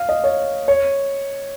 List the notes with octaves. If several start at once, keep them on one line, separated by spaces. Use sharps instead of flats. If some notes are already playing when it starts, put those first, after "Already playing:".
Already playing: F5
D#5
C#5
C#5